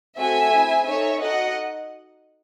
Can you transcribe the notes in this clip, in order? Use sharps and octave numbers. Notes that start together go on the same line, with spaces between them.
A3 C4 F#4 A4 E5 G#5
C4 E4 G#4
D#4 A4 C#5 E5
D#4 F#4 A4 D#5 F#5